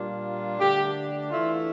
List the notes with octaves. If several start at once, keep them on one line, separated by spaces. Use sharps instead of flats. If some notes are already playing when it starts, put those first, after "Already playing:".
Already playing: A#2 G3 A#3 D4 F4
D3 A3 D4 G4
E3 A3 E4 F4